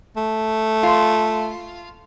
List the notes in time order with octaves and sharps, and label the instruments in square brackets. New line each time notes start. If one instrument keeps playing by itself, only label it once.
[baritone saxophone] A3
[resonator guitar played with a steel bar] F4